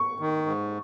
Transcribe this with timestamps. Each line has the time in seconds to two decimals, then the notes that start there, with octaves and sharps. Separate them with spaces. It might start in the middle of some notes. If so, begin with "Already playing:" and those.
Already playing: C#6
0.20 D#3
0.46 G#2